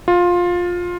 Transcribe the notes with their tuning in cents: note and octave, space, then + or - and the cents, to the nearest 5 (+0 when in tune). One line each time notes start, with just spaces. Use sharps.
F4 +15